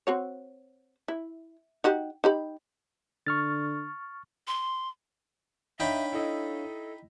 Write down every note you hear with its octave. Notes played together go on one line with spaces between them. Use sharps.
C4 F#4 C#5
E4
D#4 F#4 G4
D#4 G4 B5
D3 C#6 F6 A6
C6
D4 D#4 C#5 E5 F5 G5 B5
E4 A4 D#5